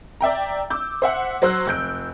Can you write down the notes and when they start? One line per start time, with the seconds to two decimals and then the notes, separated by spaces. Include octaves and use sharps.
0.21 D5 E5 G5 A#5
0.70 D6 E6 G6
1.02 C5 E5 F#5
1.42 F#3 C5 E6 F#6
1.66 F1 E6 G6 D7